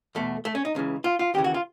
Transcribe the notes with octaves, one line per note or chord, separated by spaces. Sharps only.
E2 B2 A3
A3
C#4
D#4
C#2 C#3 E3
F4
F4
D#2 C#3 E3 G4
F#4
F4